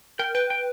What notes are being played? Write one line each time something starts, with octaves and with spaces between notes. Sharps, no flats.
A#4 G5
B4 G5
G5